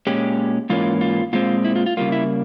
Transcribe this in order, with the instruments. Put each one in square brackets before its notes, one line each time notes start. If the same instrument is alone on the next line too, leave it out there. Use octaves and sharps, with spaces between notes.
[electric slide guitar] A#2 G#3 C#4 G4
G#2 E3 A#3 C#4 F4
F4
A#2 G#3 C4 F4
E4
F4
F4
C#3 G3 A#3 F4
E4